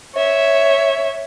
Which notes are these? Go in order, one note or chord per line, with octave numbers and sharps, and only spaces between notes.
C#5 E5